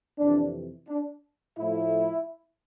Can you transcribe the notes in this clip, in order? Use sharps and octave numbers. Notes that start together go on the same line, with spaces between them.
F2 C3 E3 D4
D4
A2 F3 A3 E4